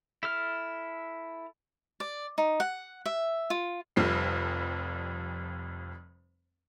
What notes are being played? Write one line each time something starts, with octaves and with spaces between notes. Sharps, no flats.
E4 A4 F6
D5
D#4
F#5
E5
F4
F1 F2 G3 C7